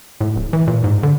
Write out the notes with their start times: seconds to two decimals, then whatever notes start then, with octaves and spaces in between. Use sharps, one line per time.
0.21 A2
0.36 D1
0.53 E3
0.67 A#2
0.84 G#2
1.03 D3